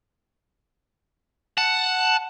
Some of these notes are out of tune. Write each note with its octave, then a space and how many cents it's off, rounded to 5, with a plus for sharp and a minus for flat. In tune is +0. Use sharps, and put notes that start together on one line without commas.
F#5 +0 A5 +0